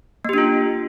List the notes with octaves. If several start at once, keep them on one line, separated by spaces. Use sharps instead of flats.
A#3 D4 F4 G4